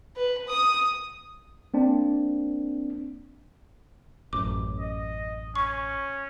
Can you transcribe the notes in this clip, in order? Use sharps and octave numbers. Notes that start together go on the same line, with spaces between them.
B4
D#6
A#3 C4 D4
A1 F#2 D6
D#5
C#4 C#6